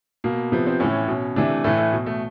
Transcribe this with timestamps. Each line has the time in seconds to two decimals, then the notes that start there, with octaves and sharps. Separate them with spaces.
0.24 B2 A#3
0.52 C3 F3 B3
0.67 C4
0.80 A2 E3 C#4
1.08 B2
1.36 C3 E3 D4
1.50 A3
1.64 A2 E3 A3
1.78 A3
1.92 B2
2.06 A3